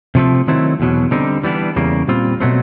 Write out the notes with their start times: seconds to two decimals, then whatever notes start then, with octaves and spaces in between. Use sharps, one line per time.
0.15 C3 F3 A3 C4
0.47 D#3 F#3 A3 C4 E4
0.80 E2 B2 F#3
1.11 D3 G3 C4 D#4
1.43 E3 G3 B3 D4
1.76 E2 C#3 G3 A#3
2.08 A#2 G3 C4 F4
2.40 B2 F#3 A3 C4